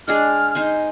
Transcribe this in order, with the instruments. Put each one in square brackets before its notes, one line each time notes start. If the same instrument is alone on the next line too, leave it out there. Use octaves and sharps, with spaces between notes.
[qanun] G#3 D4 G#4 [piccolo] F6
[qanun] D#4 C5 G#5